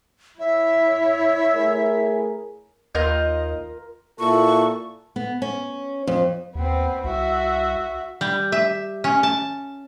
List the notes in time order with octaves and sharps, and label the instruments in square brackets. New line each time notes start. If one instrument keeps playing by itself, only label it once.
[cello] E4 C#5 [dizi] E5
[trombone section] A3 G#4 A#4
[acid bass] D#2 [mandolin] F4 A#4 G6 [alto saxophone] D#5
[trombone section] A#2 E4 A4 [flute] C#6
[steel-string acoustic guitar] B3
C#4
F2
[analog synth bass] D#2 [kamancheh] B3 C4
[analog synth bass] C2 [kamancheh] F#4 E5
[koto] G3
E5
C#4
A5